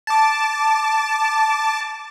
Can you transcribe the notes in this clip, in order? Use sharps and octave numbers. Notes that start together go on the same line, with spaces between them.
A5 D6